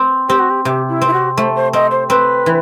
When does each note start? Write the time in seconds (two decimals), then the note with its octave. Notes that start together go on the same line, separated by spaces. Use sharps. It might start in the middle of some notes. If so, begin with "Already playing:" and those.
Already playing: C4
0.29 C4 G4
0.39 F#4
0.50 G4
0.65 C3 G4
0.89 E4
1.01 C4
1.07 E4
1.13 F#4
1.37 A3 C5
1.56 C5
1.73 C4 D#5
1.91 C5
2.09 C4 B4
2.46 E3